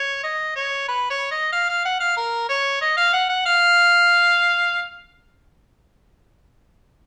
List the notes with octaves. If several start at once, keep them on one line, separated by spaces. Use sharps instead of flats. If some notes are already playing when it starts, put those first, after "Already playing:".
Already playing: C#5
D#5
C#5
B4
C#5
D#5
F5
F5
F#5
F5
A#4
C#5
D#5
F5
F#5
F#5
F5